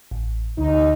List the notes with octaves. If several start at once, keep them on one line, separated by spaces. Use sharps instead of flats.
A1
D2 D#4